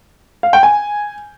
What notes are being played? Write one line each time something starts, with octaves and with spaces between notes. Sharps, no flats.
F5
G5
G#5